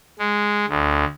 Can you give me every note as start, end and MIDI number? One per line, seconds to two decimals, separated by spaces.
0.19 0.66 56
0.69 1.05 38